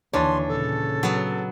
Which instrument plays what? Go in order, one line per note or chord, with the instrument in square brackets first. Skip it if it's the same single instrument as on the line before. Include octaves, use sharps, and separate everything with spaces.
[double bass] D#2 D3 [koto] E3 D4 [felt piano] C#5 A5 [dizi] C6
[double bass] A#2 C#3 [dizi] A4
[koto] F#3 B3